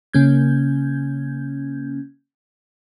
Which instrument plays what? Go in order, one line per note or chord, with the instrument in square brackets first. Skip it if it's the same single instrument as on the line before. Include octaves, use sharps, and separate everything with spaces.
[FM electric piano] C#3 A#3 C#4 G6 G#6